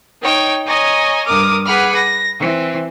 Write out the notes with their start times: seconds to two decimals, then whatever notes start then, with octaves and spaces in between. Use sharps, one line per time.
0.21 D#4 C#5 G5
0.65 C#5 D#5 G#5 A#5
1.26 G2 A#4 D6 D#6 F6
1.65 G#4 B4 F#5 B5 D6 F6
1.95 A#6
2.39 E3 C4